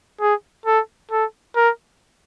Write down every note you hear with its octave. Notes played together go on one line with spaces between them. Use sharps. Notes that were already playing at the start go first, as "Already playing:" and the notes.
G#4
A4
A4
A#4